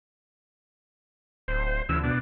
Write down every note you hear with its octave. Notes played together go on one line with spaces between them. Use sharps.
D1 C5
D2 C#3 E3 E6
B2 D4